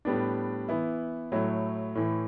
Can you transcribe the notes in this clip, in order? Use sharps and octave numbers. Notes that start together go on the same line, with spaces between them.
A2 G3 B3 D4
E3 B3 E4
A2 F#3 A3 E4
A2 E3 A3